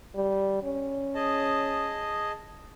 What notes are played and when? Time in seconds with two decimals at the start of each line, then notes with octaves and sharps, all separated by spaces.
0.15 G3
0.63 C#4
1.15 G#4 D#5 A5